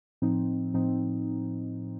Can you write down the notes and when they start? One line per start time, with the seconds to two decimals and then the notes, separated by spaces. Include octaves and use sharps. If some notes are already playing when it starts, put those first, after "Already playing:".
0.22 A2 F3 C4 D#4
0.74 A2 F3 C4 D#4